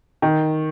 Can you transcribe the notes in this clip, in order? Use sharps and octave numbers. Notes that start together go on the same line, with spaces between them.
D#3